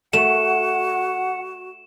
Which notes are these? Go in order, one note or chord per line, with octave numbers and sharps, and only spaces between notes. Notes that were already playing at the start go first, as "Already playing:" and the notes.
A3 F#4 F#5 E7